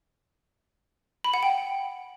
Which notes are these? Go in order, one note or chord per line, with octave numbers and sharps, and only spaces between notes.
B5
F#5
G5